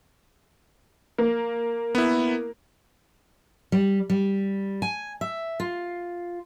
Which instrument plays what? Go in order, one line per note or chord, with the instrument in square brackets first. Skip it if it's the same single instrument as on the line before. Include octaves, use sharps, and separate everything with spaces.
[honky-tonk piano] A#3
[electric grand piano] B3 E4
[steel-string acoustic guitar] G3
G3
G#5
E5
F4